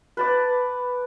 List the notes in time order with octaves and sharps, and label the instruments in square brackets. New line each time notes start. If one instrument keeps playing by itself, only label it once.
[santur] B4 A5 D6